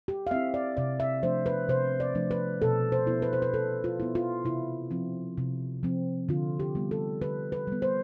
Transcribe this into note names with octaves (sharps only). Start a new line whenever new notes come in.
G4
F5
C4 E4 E5
D5
C3 D5
E5
F3 A3 D4 C5
B4
C3 C5
D5
F3 A3 D4
B4
B2 A4
C5
B3 E4
B4
C5
B4
B2 A4
F4
B3 E4
F4
C3 E4
F3 C4
C3
F3 C4
D3 F4
G4
G3 B3
A4
D3 B4
B4
G3 B3
C5